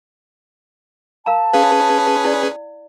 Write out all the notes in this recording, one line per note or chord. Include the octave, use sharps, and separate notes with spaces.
A#4 F5 A5 A#5
C#4 G#4 B4 F5
E4 D5